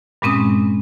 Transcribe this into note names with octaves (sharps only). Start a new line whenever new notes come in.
G2 A#2 G#3 C4 C#4 D#6